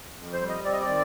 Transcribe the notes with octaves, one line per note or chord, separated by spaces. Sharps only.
F2
C5
G3
D#5
C4 D5
D#5
D5
D#3